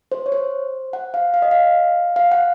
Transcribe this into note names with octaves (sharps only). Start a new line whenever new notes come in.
C5
C#5
C5
F#5
F5
F5
D#5
F5
F5
F#5